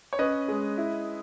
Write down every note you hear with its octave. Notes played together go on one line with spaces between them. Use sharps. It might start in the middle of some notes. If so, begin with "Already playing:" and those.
C#5
C#4 B4 D#5
G#3
E4